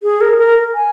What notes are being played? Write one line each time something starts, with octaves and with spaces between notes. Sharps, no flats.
G#4
A#4
A#4
G#5